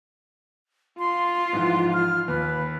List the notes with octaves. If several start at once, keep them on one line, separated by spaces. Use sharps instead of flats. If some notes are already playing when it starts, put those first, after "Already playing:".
F4 C6
G#2 E3 F3
F6
D#2 B4